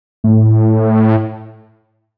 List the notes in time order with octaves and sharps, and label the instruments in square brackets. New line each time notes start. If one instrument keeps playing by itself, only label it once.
[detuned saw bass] A2